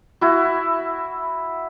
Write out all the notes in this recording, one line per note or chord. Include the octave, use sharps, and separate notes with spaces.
E4 F#4